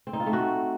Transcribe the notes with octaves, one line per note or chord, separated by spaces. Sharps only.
C4
D#4
F4
A3
F#4